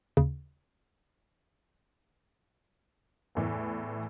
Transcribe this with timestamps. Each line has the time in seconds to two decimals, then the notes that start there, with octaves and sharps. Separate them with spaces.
0.17 D#2 C#3
3.35 E2 A2 E3